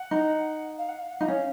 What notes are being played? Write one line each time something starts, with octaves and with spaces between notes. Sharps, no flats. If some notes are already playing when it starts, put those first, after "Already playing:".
Already playing: F#5
D#4
F5
F#5
F5
F#5
D#4 F5
C#4